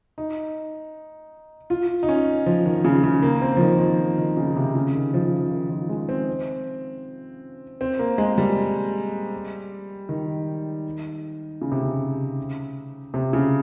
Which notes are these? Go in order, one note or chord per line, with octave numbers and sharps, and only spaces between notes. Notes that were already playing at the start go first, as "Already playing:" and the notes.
D#4
F4
D#4
C#4
F3
D#3
C#3
C#3
A#3
C4
F3
D#3
F3
D#3
C#3
C3
C#3
D#3
F3
D#3
F3
G#3
C4
C4
A#3
G#3
G3
D#3
C#3
C3
C#3
C3
C#3